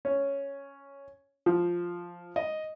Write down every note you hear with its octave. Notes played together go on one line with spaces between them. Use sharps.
C#4
F3
D#5